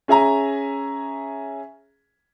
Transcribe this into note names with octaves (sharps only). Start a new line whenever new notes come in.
C#4 G#4 E5 G#5 A#5